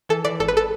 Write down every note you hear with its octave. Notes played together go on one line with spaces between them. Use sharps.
E3 A4
E3 D5
G#1 A4
B4
A4